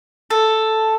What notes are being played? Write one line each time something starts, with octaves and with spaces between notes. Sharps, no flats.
A4